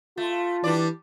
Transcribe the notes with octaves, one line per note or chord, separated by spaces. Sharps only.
A3 F4
E3 G3 D4 D5